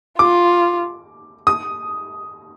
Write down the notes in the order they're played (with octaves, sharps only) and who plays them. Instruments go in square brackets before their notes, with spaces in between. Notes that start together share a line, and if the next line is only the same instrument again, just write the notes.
[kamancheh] F4 [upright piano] D6
[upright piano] D#6